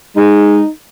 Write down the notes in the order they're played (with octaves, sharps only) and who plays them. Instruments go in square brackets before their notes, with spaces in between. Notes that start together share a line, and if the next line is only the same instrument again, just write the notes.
[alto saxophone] G#3 [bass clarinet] D#4